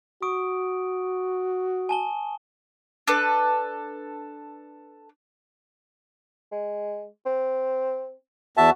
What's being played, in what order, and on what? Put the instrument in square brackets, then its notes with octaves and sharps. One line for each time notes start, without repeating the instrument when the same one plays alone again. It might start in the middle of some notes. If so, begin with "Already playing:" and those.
[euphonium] F#4 [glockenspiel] C#6 D#6 D7
[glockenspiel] G#5 A5 G7
[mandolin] D4 A4 B4
[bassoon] G#3
C4
[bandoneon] E2 E5 A5 [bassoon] F#4